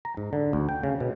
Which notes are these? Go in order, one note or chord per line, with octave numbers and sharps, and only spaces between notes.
A#5
G#2
D3
D2
G5
C#3
B2